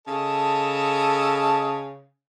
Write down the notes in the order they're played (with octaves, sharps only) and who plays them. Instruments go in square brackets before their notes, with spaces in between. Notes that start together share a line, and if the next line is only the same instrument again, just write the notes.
[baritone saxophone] C#3 [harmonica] A4 D#5 A5